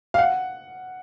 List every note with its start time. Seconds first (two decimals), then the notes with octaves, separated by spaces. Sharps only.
0.14 F5
0.18 F#5